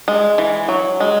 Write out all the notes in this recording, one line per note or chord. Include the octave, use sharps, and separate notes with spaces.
G#3
E3
F#3
G#3